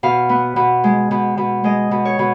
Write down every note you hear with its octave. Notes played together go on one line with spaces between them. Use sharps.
B2 F5
B3
B2
G#3
B2
B2
G#3 D#5
B2
C#5
B2